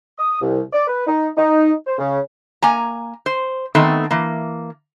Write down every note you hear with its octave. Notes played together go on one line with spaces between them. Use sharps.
D#6
C2
D5
B4
D#4
D#4
C5
C#3
A#3 G#5 A#5
C5
D#3 A3 B3 C4 D#4
E3 A#3